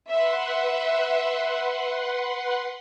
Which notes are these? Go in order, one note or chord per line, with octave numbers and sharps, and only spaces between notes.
B4 E5 F#5 C6